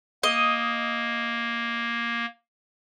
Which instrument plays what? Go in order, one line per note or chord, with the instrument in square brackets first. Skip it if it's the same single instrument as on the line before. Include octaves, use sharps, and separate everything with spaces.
[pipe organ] A#3 [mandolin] D#5